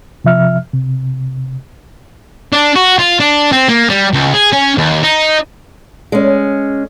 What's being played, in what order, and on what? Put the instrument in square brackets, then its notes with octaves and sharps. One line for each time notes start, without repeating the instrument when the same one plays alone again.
[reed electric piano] C3 F3 E5 F6
C3
[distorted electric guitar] D4
F#4
F4
D4
C4
A#3
G3
C#2
G#4
C#4
D#2
D#4
[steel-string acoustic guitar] G#3 C#4